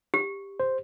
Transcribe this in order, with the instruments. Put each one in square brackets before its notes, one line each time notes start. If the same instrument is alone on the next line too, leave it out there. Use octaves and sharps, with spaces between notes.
[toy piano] G4
[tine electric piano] C5